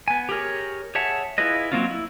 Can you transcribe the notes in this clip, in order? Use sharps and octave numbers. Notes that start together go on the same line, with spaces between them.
B3 G#5
G4 G#4 A#4 C#5
G#4 C#5 E5 F#5 A5
E4 F4 G#4 B4 D#5
F#3 A#3 C4 C#4 F4
E4